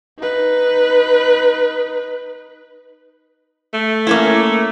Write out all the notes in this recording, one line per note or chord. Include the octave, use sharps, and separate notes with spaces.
D#4 B4
A3
A#3 C#4 E4